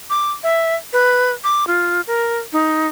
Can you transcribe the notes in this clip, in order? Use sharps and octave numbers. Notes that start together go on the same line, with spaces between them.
D6
E5
B4
D6
F4
A#4
D#4